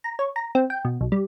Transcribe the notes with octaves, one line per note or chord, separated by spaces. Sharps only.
A#5
C#5
A#5
C4
G5
B2
B1
G3